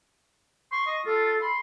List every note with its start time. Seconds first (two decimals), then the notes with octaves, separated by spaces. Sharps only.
0.72 C6 C#6
0.87 D#5
1.06 F4 A4
1.41 B5 C6